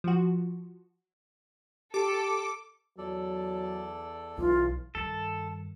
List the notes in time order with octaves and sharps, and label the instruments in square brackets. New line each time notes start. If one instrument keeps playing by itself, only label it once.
[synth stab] F3 F#4
[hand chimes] G4 [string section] A4 [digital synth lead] D6
[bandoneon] E2 A4 D5 [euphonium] F#3
[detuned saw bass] B1 [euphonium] E3 [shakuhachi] F4
[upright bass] G2 D#3 [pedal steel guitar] A4